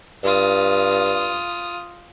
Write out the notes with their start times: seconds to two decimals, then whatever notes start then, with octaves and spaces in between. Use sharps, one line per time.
0.24 G2 F4 D#6